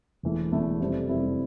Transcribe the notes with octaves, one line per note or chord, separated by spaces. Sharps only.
E1 E2 E3 A3 E4
E1 E2 E3 A3 E4
F2 C3 G3 C4 E4
F2 C3 G3 C4 E4